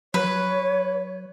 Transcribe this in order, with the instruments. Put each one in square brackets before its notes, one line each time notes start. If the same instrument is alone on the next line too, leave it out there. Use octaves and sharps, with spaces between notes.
[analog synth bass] F#3 [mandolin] B4 [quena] C#5